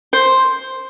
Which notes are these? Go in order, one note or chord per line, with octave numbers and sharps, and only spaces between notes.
C5